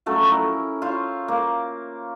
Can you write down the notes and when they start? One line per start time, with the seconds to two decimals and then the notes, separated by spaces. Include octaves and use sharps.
0.06 F3 F#3 A3 C#4
0.23 E4 A#4
0.82 F4 C5 C#5 F5
1.28 A#3